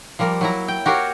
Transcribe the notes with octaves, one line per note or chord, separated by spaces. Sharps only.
F3 G3 A#3 A#4
F#3 E4 A#5
G5
F#4 G4 A#4 C#5 F5